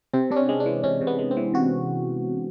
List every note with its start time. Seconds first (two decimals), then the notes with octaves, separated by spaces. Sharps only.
0.14 C3 C4
0.31 C3 D4
0.36 C#4
0.49 G#3
0.60 D4
0.66 E3
0.84 C3 C#4
1.01 C3
1.07 B3
1.19 G#3
1.31 C4
1.37 E3
1.54 C3 F#4